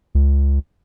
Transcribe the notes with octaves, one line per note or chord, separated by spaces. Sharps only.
C#2